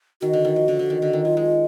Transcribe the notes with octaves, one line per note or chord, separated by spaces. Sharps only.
D#3 F#4
D3
D#3
F3
D3
D3
D#3
D3
D#3
F#3 F4
G#3